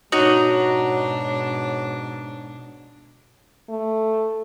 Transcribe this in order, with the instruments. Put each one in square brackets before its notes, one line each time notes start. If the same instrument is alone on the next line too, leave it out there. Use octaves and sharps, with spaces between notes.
[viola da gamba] G#2 B2 D4 [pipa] D#4 [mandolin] F#4 [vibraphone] C#5
[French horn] A3